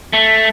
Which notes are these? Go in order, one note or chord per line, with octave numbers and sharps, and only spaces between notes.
A3